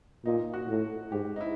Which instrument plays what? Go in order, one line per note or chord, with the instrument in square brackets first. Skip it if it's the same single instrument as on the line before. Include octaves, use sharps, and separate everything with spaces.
[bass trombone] A#2 [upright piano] D#4
[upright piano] F#4
[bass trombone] A2
[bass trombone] G#2 [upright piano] G4
[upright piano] D#4
E4